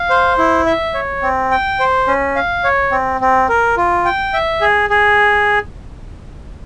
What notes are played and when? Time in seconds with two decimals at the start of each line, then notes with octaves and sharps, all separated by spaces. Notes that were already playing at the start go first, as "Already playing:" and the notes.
Already playing: F5
0.10 C5
0.38 E4
0.66 E5
0.94 C#5
1.22 C4
1.51 G5
1.80 C5
2.07 C#4
2.36 F5
2.64 C#5
2.92 C4
3.21 C4
3.49 A#4
3.77 F4
4.05 G5
4.33 E5
4.61 G#4
4.90 G#4